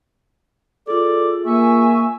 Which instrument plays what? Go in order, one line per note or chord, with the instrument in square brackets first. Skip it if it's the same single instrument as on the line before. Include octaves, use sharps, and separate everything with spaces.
[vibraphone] F4 G#4 [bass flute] A4 [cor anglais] D5
[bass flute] A#3 [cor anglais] E5 [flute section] G#5 C#6